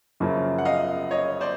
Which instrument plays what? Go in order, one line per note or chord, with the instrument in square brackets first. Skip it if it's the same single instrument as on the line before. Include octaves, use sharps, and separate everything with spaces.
[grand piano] F#2 C#3 F3 A#3
[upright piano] F#5
D#5 F5
C#5 D#5
C5 D5